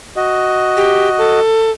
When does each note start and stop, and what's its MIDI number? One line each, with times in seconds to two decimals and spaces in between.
0.16 1.40 66
0.16 1.40 75
0.77 1.09 67
1.18 1.71 69